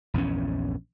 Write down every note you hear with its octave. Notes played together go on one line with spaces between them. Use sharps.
A#1 E2 G2 C#4